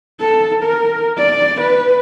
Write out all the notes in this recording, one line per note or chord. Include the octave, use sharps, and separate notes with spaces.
A4
A#4
D5
B4